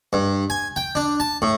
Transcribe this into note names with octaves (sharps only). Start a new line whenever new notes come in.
G2
G#5
G5
D4
A5
A2